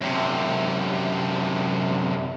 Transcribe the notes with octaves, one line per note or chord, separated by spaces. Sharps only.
F#2 C3